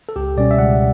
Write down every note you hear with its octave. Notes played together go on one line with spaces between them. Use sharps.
A4
C#2 G4
B2 G3 C#4 D5
E5
C#2 F#5